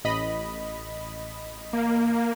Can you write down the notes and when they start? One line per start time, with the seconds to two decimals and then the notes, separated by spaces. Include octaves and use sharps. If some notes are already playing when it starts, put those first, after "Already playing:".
0.04 A1 D#5 B5
1.73 A#3